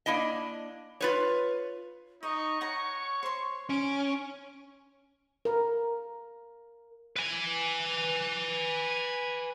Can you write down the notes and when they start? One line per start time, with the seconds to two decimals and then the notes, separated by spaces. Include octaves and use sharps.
0.06 A#3 D4 E4 D#5
1.01 F4 B4 C#5
2.23 D#4 D#5 C#6
2.61 C#5 F#5 A#5
3.23 C5 C6
3.69 C#4 D7
5.45 A#4
7.16 B4 G#5